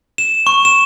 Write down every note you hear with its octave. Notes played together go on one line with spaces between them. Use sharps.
E7
C#6
E7